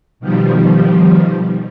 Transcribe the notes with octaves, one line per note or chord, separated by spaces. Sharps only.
B2 D#3 F3 G3